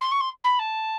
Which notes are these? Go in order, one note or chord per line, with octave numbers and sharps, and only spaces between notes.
C6
C#6
C6
B5
A5